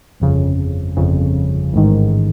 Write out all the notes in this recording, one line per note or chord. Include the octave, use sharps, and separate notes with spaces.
G1 F2 C#3
G1 F2 C#3
A1 G#2 D#3